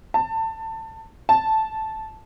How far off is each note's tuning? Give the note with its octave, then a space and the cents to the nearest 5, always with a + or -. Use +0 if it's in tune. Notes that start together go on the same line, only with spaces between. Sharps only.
A5 +25
A5 -5